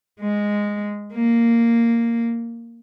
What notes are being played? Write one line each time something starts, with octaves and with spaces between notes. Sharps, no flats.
G#3
A#3